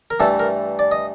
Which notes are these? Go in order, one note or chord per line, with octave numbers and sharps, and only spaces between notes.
A#4
G2 E3 A3 A4
A#4
D5
D#5